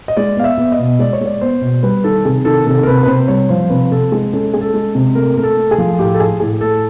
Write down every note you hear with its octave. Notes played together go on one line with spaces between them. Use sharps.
D#5
G#3 D5
B3 F5
E5
B3
D#5
B2
G#3 D5
C#5
G#3 D5
B3 C5
B2
G3 B4
D#3 A4
C3 G#4
D#3 A4
C3 A4
A#4
C3 B4
B4
C3 C5
G3 C#5
F3 C5
C3 B4
C3 A4
G#3 G#4
C#4 A4
G#3 G#4
A4
G#3
C3
A3 A#4
A3 A#4
A4
A3
G#4
F3
A2 G4
A4
A2 G#4
A2 G#4
A3 A4